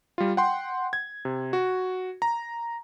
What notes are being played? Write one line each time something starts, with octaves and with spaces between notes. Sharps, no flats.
G3 F4
F#5 G5 C6
G#6
C3
F#4
A#5